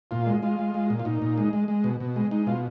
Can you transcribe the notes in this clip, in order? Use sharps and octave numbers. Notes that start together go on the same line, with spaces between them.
A#2 F4
G#3
G#3 F4
G#3
G#3
A#2
F4
A#2 D#4
A#2
G#3
G#3
G#3
B2
B2
G#3
G#3 D#4
B2 F4